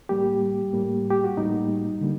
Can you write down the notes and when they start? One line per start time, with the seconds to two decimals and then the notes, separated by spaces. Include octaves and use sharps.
0.09 A2 G3 A#3 G4
0.73 A2 G3 A#3
1.10 G4
1.24 F#4
1.37 A2 G3 A#3 D#4
2.01 D3 G3 A#3